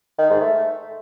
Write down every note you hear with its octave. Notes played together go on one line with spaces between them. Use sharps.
D#3
G#2
A3